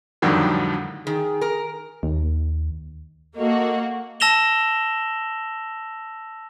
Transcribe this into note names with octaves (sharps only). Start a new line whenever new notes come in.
F2 A2 D3 D#3 F#3 G3
D#3 G#4
A#4
D#2
A#3 F#4 A4 D#5
A5 E6 A#6 E7 F7 G7